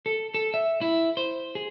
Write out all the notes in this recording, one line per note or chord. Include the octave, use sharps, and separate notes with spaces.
A4
A4
E5
E4
C5
G#4